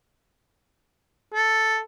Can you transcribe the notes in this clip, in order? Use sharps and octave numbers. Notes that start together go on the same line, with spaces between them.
A4